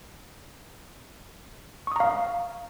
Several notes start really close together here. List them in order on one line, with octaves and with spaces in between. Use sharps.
C#6 D#6 A#5 F5